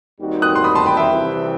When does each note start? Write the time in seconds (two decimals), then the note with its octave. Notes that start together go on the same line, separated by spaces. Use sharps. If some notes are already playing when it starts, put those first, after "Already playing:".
0.19 D#2 D#3 G3 C4 F#4
0.42 D#6 F#6
0.55 C6
0.64 B5 D#6
0.75 A5 C6
0.86 G5 B5
0.97 E5 G5
1.09 C2 C3 E3